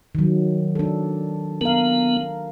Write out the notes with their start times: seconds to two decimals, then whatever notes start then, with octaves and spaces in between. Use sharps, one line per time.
0.15 D#3 F#3
0.75 D4 A4
1.61 B3 A#4 F5